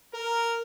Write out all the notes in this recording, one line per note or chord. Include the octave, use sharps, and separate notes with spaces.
A#4